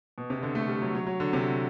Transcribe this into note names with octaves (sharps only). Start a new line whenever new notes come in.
B2
C3
D3
A3
G3
F#3
F#3
F#3
D3
C3